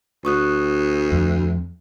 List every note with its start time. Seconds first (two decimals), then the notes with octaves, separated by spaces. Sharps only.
0.25 D2 C#6 D#6 F#6
1.12 F2